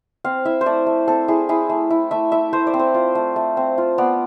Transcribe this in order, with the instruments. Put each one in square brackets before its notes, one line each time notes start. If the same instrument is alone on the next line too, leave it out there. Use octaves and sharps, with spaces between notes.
[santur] C4 F5
E4 E5
C5
A3 D5
A3
C4 A4
E4 G#4
E4 G#4
A3
E4
A3 E5
E4 E5
A3 C5
D5
C4
C5
F4
A3
A3
C4
F4
B3 D5